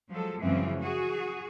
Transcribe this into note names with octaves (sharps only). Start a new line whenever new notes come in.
F3 F#3 G#3 A4
F#2 C#3 E3 F3 G#3 C4
F#4 G#4